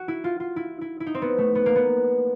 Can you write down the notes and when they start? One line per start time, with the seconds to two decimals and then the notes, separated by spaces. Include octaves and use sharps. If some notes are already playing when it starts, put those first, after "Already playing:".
Already playing: F#4
0.08 E4
0.24 F4
0.40 F4
0.56 E4
0.81 E4
1.00 E4
1.06 D#4
1.14 C4
1.22 B3
1.38 A3
1.55 B3
1.66 A#3
1.76 B3